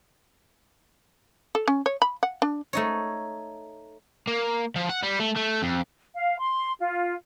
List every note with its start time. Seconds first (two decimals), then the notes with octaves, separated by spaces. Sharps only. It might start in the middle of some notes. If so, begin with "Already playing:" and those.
1.55 A4
1.68 C#4
1.86 C#5
2.02 B5
2.23 F#5
2.42 D4
2.73 A3 D#4 C#5
4.28 A#3
4.76 F3
4.90 F#5
5.03 G3
5.20 A3
5.37 A3
5.63 F2
6.14 F5
6.38 C6
6.78 F4